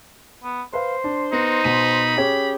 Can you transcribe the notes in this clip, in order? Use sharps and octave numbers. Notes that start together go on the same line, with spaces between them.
B3
B4 C5 F5
D4
B3 D#4 F#4
B2 B5 D#7
C#4 G4 G#4 C#5